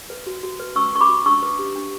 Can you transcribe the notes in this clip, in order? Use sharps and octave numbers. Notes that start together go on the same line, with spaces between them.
B4
F#4
F#4
B4
C#4 C#6 E6
B4 C#6
B5 D6
F#4
D4 C#6 E6
B4
G4
D4